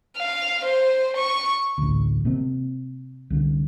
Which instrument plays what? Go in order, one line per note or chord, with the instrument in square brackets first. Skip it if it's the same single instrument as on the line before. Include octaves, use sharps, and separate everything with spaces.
[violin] F5
C5
C#6
[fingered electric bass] A1 D2
C3 A#3 C4
C2 D3